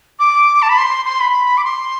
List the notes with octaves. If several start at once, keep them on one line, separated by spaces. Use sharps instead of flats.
D6
A5
B5
C6
C6
B5
D6
C6